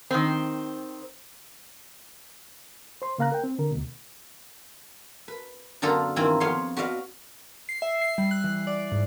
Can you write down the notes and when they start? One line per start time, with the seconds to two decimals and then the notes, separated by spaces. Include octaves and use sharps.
0.11 D#3 C4
3.02 C5 C6
3.18 C#3 A#3 F5 A#5 F#6
3.32 A#4 G5
3.44 C4
3.59 D3 A#4
3.71 D2 B2
5.28 B4
5.82 F#2 D3 B3 F4 A4 A#5
6.16 G2 D#3 E3 A#3 C4 E4
6.40 F2 B3 C#5 F5 C6
6.77 F#4 B4 D5 D#5 F5
7.69 C7
7.82 E5
8.01 C7
8.18 G3
8.31 F#6
8.44 E3
8.67 D5
8.92 G#2